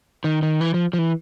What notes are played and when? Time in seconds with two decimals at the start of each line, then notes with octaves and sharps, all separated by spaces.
0.24 D#3
0.42 D#3
0.61 E3
0.74 F3
0.93 F3
0.98 E3